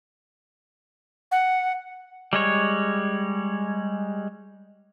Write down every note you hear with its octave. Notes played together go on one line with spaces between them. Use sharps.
F#5
G3 G#3 C#5